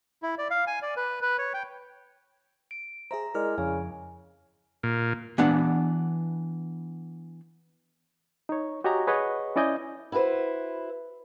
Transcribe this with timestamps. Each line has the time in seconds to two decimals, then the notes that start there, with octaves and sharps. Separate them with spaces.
0.23 E4
0.38 D5
0.50 F5
0.67 G#5
0.82 D5
0.97 B4
1.22 B4
1.38 C#5
1.54 G5
2.71 D7
3.11 G#4 C5 E5 A#5
3.34 G#3 E4 A#4 D5 F6
3.58 F2 C#3 G#5
4.83 A#2
5.38 E3 B3 D4 F#5
8.49 D#4 C#5
8.84 F#4 G4 C#5 D#5 G#5 A#5
9.07 G#4 B4 C#5 D#5 F#5
9.56 C#4 E4 D5 D#5 G#5 G6
10.12 E4 F#4 A4 B4 C5